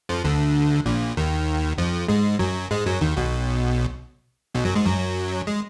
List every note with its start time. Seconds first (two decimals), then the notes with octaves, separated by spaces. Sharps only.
0.09 F2 F3
0.24 D2 D3
0.86 A#1 A#2
1.17 D#2 D#3
1.78 F2 F3
2.08 G#2 G#3
2.39 F#2 F#3
2.71 G#2 G#3
2.86 F#2 F#3
3.01 D#2 D#3
3.17 B1 B2
4.54 B1 B2
4.65 F#2 F#3
4.75 G#2 G#3
4.86 F#2 F#3
5.47 G#3